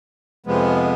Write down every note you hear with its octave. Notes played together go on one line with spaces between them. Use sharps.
F2 C3 F3 G#3 B3